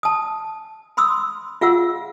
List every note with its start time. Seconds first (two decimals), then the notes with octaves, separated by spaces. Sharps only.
0.03 A5 D#6
0.97 B5 C6 D#6 E6
1.61 F4 G#4 F5 F#5 E6